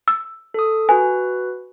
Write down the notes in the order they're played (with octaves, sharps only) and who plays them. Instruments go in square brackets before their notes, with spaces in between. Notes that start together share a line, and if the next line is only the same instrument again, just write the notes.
[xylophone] E6
[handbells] A4 D#6
[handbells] F#4 B4 [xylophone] G#5